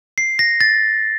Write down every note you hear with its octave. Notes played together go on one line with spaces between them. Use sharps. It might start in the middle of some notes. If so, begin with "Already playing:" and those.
C7
A#6
A6